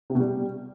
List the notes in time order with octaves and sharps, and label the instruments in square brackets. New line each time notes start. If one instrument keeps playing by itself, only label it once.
[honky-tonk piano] C3
B2
G3